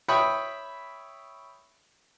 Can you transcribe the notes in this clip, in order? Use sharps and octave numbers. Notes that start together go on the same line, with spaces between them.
C#5 E5 G5 B5 C#6 D#6